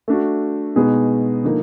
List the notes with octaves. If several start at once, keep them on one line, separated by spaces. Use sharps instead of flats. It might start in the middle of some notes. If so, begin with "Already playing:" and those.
A3 D4 F#4
B2 G#3 B3 D#4 G#4
D3 F3 A#3 D#4